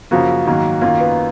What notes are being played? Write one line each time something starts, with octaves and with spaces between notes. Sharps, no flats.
F#2 C#3 F3 A#3 F#4
G#2 D#3 F#3 A#3
F#2 D#3 A#3 F4
B3